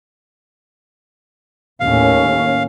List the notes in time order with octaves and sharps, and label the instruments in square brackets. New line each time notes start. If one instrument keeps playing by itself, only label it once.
[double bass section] D#2 A2 C#4 [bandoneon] F5